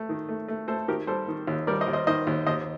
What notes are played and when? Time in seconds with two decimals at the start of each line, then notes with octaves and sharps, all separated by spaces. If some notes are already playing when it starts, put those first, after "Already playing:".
Already playing: A3
0.09 D#3
0.29 A3
0.48 A3
0.68 A3 A4 C5
0.88 D#3 G4 A#4
1.07 G3 A4 C5
1.28 D#3
1.47 D#2
1.67 G3 A#4 D5
1.81 C5 D#5
1.88 D#2
1.93 C5 D#5
2.07 D#3 C5 D#5
2.27 D#2
2.46 D#2 C5 D#5